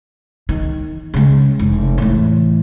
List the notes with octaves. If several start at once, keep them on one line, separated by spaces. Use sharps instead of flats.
D#3
C#3 G#3
F1
A2 E3